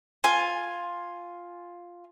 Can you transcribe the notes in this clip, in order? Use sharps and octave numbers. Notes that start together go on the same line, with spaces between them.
F4 G#5